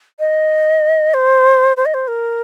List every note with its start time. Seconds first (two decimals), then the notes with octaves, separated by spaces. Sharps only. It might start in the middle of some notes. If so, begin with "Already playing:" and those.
0.19 D#5
1.14 C5
1.77 C5
1.86 D#5
1.94 C5
2.08 A#4